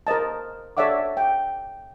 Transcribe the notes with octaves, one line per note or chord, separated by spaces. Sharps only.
A#4 C5 D#5 A5
A4 C#5 D5 E5 F#5 D6
G5